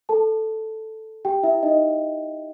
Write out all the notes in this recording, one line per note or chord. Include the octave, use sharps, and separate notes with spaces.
A4 A5
G4 G5
E4 E5
D#4 D#5